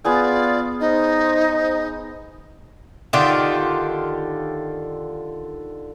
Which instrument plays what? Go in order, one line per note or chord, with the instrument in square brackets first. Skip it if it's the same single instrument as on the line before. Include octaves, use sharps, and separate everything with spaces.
[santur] B3 G#4 G#5 [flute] F4 [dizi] D5
[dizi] D#4 [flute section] C5 [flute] D#5
[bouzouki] D3 D#3 F4 G4